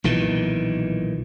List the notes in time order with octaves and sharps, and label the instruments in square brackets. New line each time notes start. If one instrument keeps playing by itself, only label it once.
[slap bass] B1 A#2 D#3 E3